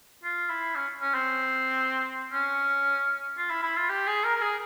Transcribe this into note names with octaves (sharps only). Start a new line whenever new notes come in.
F4
E4
C#4
C#4
C4
C#4
F4
E4
E4
F4
G4
G#4
A#4
A#4
G#4